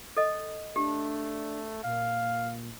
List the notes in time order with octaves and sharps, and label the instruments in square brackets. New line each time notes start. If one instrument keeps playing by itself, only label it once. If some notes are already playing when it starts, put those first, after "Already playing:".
[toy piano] A4 D#5
[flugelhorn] A3 [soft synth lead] D4 [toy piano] G4
[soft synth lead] A#2 [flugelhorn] F5